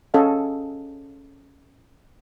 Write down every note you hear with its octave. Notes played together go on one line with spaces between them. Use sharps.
C#4 A4 D#5 F5 G#5